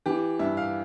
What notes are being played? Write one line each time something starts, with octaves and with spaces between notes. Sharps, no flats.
E3 G4
G2 E5
F5